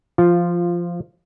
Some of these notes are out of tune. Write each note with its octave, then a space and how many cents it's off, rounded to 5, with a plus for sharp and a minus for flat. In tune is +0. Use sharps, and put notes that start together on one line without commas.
F3 -10 F4 +0